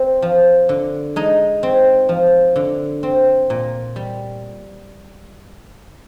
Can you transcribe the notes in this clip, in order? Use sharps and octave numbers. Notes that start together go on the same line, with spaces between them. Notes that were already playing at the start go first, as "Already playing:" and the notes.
Already playing: C4
F3
D3
G#3 D#4
C4
F3
D3
C4
A#2
G3